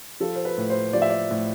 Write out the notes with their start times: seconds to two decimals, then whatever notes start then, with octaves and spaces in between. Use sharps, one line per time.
0.20 F3 A4
0.36 C5
0.45 B4
0.57 A2
0.70 C5
0.93 F3 D5
1.02 E5
1.10 D5
1.31 A2